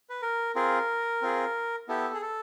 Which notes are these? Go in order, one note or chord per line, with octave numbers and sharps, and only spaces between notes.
B4
A#4
C4 F4 G#4 A#4
C4 F4 G#4
B3 E4 G4 A4
G#4
A4